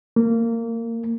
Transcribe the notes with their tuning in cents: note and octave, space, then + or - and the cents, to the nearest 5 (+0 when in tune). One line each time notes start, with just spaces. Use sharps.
A#3 -20